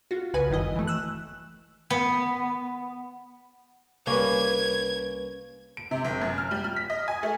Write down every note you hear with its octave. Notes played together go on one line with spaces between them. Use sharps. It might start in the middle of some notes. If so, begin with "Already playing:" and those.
F4 F#4
C2 C#3 F#4 B4 G#5
G1 F#2 D#3 E4 D#5
E3 A3
E6 F#6
B3
C2 G3 A#3 C#4 B4 G#6
D7
C3
G1
F#2
F6
G3
F6
B6
D#5
G#5
A3